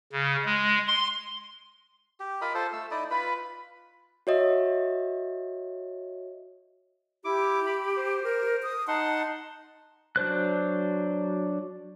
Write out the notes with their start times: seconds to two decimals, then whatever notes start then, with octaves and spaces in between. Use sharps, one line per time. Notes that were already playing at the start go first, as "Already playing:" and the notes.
0.12 C#3
0.45 G#3
0.87 C6
2.20 G4
2.41 F4 A#4 D#5 B5
2.55 F4 A4 C5
2.73 A3 E6
2.91 D#4 E4 D5 D#5
3.11 F4 B4 B5
4.27 F#4 C#5 D#5 E5
7.25 E4 G4 D6
7.66 B5
7.97 C5
8.23 A#4
8.63 D#6
8.88 D#4 F#5 A5 C6
10.16 F#3 D4 C5 F#6